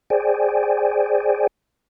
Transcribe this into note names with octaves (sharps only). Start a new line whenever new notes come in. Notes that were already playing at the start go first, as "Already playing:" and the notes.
G#4 C5 D5 G5 G#5